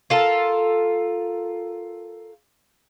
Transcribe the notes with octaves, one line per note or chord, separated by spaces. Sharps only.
F4 A4 A#4